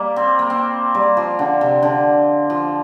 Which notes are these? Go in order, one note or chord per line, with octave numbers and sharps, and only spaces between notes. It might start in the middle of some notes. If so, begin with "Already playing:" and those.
Already playing: G3 A#3
C4
A#3
C4
G3
F3
D3
C3
D3
F3